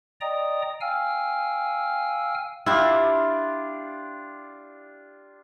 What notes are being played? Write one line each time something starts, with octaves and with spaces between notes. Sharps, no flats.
D5 D#5 G5 A#5 D#6
F5 G5 G#5 E6 F6
D4 E4 F4 G4